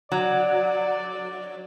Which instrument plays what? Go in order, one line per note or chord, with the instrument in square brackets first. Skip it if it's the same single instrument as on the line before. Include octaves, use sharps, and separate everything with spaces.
[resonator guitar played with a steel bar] F#3 [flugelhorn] D5